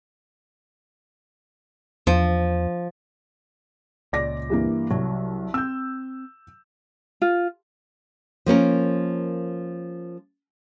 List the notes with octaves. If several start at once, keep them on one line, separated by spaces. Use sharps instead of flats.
E2 F3
C#2 A#2 D5 D6 A#6
G2 E3 A#3
C2 F#3
C4 E6 G6
F4
F3 A#3 C#4 A#4